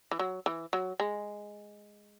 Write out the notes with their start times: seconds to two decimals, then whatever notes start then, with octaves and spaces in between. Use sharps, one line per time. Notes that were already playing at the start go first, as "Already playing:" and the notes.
0.11 E3
0.19 F#3
0.46 E3
0.73 F#3
1.00 G#3